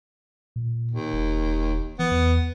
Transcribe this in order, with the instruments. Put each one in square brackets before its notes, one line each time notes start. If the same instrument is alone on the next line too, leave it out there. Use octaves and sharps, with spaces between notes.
[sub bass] A#2
[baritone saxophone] D#2
[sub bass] E1
[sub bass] E3 [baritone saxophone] B3
[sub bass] E2